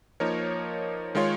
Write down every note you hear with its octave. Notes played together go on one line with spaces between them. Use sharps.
F3 A#3 D#4 A#4 C#5
D#3 G#3 F4 C#5